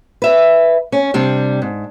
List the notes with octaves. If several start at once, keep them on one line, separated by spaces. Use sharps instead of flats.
B4 E5
C#4
C3 G3 D4
G#2